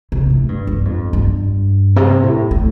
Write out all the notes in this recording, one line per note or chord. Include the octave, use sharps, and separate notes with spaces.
C3
A2
G2
G2
F2
G2
C3
A2
A2